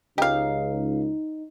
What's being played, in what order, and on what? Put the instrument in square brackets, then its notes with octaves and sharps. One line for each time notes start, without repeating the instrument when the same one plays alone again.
[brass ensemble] C#2 [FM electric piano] D#4 [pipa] G4 F5